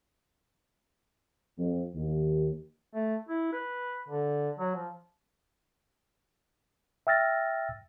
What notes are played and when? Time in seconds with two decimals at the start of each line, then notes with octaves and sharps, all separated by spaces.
1.59 F2
1.95 D#2
2.94 A3
3.29 E4
3.53 B4
4.09 D3
4.59 F#3
4.76 F3
7.07 E5 G5 E6 F6 A6 A#6